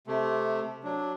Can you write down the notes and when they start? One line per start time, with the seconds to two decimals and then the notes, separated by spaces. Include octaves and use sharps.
0.07 C3 A3
0.84 F#3 D4